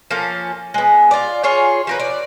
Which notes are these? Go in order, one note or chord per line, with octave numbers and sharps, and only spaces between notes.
F3 A#3 C#4 A4
G#3 B3
F4 D5
F4 G#4 C#5
F3 A#4 B4
D5